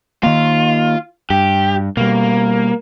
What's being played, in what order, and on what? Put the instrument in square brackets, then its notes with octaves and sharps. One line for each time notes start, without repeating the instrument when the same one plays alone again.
[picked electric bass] D#3 A#3 [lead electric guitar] F4
[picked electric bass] G2 [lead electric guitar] G4
[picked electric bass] B2 G3 [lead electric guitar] A#3